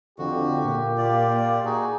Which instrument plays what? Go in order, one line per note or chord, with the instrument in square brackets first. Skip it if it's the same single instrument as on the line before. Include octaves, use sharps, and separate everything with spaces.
[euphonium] F2 [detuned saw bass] D3 [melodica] F#4 [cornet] G4
[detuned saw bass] A#2 [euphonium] A#3
[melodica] F4 D5
[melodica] D#4 F#4 [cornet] G#4